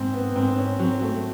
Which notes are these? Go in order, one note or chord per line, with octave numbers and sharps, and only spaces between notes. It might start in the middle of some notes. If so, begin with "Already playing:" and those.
Already playing: G#2 C4
B3
G#2 C4
C#4
F#3 C4
A3